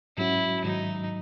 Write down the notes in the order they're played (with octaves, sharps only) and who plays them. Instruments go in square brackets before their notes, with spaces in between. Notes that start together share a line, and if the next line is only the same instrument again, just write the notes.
[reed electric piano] G#2 F#3 C#4 F#4 [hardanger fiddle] E4
[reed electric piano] G#2 D#3 F#3 [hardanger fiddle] D#4